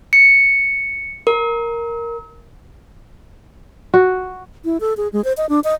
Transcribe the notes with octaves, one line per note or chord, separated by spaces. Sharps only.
C#7
A#4
F#4
E4
A4
G#4
G#3
C5
D#5
D4
D#5